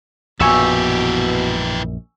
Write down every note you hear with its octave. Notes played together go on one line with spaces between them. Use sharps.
A#1 F#2 B2 E3 G4 G#5 C#6 E6